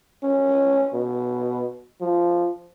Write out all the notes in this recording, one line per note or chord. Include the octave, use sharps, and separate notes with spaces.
C#4
B2
F3